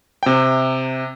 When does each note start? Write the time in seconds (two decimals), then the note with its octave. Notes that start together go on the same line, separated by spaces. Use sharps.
0.23 C3 G5